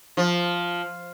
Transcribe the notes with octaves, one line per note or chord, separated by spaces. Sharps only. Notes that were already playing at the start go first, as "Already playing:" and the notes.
F3